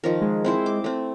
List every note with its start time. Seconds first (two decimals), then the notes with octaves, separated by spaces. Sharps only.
0.04 D#3 F3 A#4
0.22 G#3
0.44 C4 E4 C5
0.66 D6
0.84 A3 C4